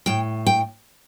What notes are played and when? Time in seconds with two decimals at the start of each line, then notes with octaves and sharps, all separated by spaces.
0.06 A2 G5
0.46 G5